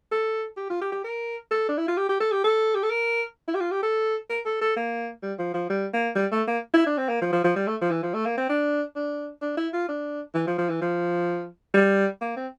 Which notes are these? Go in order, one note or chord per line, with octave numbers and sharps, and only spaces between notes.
A4
G4
F4
G4
G4
A#4
A4
D4
E4
F4
G4
G4
A4
G4
A4
G4
A4
A#4
E4
G4
F4
G4
A4
A#4
A4
A4
A#3
G3
F3
F3
G3
A#3
G3
A3
A#3
E4
D4
C4
A#3
F3
F3
F3
G3
A3
F3
E3
F3
A3
A#3
C4
D4
D4
D4
E4
F4
D4
E3
F3
F3
E3
F3
G3
A#3
C4